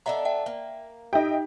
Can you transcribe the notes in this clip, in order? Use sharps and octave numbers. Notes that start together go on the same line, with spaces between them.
B3 D4 A4 D#5 E5 A#5
E5 G5
A#3
D#4 G4 D#5 E5 G5